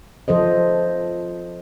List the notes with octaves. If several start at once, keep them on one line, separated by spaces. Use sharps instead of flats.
F3 A4 C5 D#5